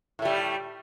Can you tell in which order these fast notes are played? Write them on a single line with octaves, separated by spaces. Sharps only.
A2 A3 G3